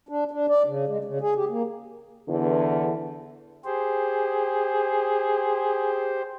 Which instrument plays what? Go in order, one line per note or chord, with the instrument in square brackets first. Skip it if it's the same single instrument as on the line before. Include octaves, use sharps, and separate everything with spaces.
[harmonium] D4
D4
D5
C#3
G#3
C#3
G#4
G4
A#3
[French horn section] E2 D3
[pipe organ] G4 C5 [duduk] G#4